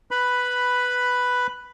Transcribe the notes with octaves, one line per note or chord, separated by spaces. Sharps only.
B4 B5